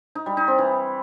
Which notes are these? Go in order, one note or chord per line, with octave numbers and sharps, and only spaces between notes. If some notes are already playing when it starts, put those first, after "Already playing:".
D#4
G3
D#4
C4
E3